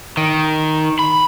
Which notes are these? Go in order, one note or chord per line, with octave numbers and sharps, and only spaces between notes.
D#3
B5